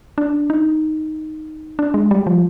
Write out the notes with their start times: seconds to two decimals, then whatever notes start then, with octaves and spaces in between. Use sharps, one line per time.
0.18 D4
0.50 D#4
1.79 D4
1.94 G#3
2.11 G3
2.27 F3